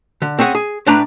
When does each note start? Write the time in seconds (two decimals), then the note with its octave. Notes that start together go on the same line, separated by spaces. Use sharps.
0.22 D3
0.39 C4 C#4 G#4 F#5
0.55 G#4
0.86 A2 A3 D4 B4 A#5 B5